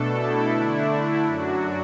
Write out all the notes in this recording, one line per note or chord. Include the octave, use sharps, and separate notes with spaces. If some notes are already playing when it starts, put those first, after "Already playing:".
Already playing: B2 A3 D4 A4
E4
D3 A3 D4 E4
E4
F#2 F#3 D4 F#4